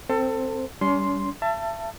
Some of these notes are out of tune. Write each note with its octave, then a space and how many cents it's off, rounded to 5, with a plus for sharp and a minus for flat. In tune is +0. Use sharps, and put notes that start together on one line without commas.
C4 +0 A4 +25 C5 +0
G3 +0 C#4 +40 C6 +0
E5 +35 A5 +15